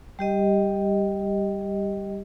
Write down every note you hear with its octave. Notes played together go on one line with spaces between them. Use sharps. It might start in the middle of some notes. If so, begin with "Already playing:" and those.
G3 G4 D#5